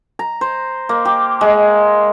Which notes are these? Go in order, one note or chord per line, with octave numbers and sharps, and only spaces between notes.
A#5
C5
A#3
G4
G#3